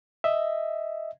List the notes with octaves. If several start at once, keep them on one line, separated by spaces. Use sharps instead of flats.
D#5 E5